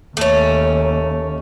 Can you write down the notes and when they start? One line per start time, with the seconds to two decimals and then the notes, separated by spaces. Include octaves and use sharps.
0.17 D#2 A3 C#4